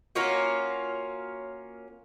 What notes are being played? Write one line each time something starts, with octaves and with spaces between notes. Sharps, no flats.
A#3 C#4 F4 F#4